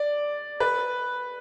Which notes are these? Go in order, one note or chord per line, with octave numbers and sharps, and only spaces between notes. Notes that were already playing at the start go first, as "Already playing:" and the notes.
Already playing: D5
B4